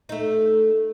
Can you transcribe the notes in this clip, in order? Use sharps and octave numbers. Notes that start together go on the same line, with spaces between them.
A3 D#4